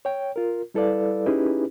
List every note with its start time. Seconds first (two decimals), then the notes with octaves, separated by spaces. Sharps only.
0.05 C#5 G5
0.36 F4 A#4
0.74 G3 E4 A4 B4 D5 F5
1.26 C#4 D#4 E4 G4 G#4 B4